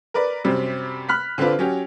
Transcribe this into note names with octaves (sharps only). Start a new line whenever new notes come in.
A#4 B4 D5
F#2 C3 G3 C4
B5 F6 F#6 B6
D3 C4 D4 F4 B4
F#3 C#4 G4